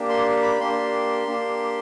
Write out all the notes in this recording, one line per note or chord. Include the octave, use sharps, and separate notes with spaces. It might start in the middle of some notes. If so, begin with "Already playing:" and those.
Already playing: A#3 D4 G4
C6
B5
A#3 D4 G4 C6
A#3 D4 G4